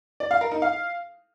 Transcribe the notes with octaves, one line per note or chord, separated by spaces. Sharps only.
D5
F5
A#4
D#4
F5